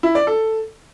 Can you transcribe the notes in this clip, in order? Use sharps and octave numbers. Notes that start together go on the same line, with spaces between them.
E4
D5
A4